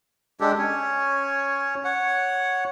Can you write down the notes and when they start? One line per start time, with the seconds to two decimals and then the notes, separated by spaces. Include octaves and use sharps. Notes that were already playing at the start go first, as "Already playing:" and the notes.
0.40 G#3 D4 G4 A4
0.58 C#4 C#5
1.84 C#5 F#5